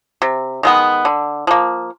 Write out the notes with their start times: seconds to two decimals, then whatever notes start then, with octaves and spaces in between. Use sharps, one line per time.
0.22 C3
0.63 D#3 G#3 B3
1.05 D3
1.47 F3 A#3